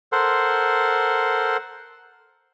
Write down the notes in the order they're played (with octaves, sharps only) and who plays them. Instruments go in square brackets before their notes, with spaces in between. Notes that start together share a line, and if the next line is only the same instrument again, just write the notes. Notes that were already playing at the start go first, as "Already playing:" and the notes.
[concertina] A4 A#4 C5 F#5 C6